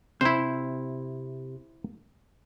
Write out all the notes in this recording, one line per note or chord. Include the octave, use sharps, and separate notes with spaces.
C3 E4 C5